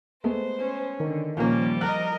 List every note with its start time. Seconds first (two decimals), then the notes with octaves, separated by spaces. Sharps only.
0.24 G#3 A3 B3 C5
0.59 C#4
1.00 D3 D#3
1.37 A#2 F3 G3 A#3 C#4
1.81 A#4 D#5 F6 F#6 F#7